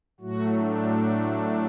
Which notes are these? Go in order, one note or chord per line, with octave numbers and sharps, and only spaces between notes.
A2 F#3 A3 F#4
D4